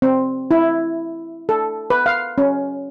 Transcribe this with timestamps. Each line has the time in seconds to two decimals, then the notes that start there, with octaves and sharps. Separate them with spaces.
0.02 C4
0.51 E4
1.49 A4
1.90 B4
2.06 F5
2.38 C#4